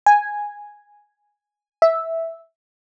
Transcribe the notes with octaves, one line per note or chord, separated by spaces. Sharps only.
G#5
E5